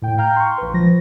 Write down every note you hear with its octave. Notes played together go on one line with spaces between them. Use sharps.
A2 G5
F5 G5 A#5 F6 G6
C6 C#6
A#1 B4
F3 A#6